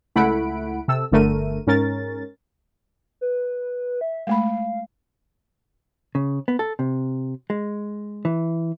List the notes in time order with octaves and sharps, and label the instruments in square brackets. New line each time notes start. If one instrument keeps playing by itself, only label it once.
[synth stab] C#2 A3 E4 F#5 B5 D7
C3 A4 E6
G1 D3 A3 A#4 D#7
G#2 C#4 A#4 A6
[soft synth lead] B4
E5
[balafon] G#3 A3 B5 [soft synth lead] F5
[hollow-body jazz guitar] C#3
B3
A4
C3
G#3
E3